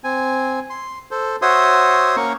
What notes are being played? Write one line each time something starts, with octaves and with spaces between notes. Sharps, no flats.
C4 G#5
C6
A4 C5
F#4 C5 C#5 E5 C6 D#6
A#3 C#4 A#4 C#6